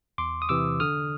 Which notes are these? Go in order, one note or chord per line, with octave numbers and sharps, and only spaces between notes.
E2 C6 D6
D#6
C3 E3 D6 E6
D3 D#6 F6